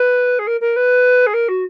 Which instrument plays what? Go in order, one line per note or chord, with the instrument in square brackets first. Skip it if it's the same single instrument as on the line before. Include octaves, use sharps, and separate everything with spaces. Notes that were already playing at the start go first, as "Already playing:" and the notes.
Already playing: [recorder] B4
G#4
A#4
A#4
B4
G#4
A#4
F#4